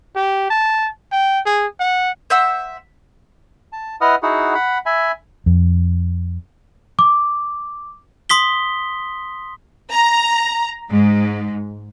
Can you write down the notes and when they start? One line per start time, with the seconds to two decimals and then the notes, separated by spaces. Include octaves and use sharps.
0.16 G4
0.50 A5
1.12 G5
1.46 G#4
1.80 F#5
2.30 C5 E5 F#5 E6
3.73 A5
4.01 E4 B4 D#5 F#5 D#6 F6
4.23 D#4 E4 F#4 G#4 F#5
4.55 F#5 B5
4.86 E5 G#5 B5
5.46 F2
6.99 D6
8.29 C6 D#6 B6 G7
9.91 A#5
10.91 G#2